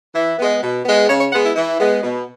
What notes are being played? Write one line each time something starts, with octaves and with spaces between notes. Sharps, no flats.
E3 E4
G#3 B3
B2
G#3 B3
C#3 C#5
C#5
G#3 B3 F#5
E4
E3 E4
G#3 B3
B2